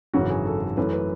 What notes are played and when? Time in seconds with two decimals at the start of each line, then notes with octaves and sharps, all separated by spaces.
0.14 G#1 F#2 C#3 E3 F#4
0.30 G#4
0.45 A4
0.61 A4
0.77 F#2 E3 A3 B4
0.93 B4